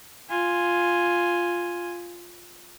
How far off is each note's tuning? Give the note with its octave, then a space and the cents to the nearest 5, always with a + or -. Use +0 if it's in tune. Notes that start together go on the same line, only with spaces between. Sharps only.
F4 +0 G#5 +0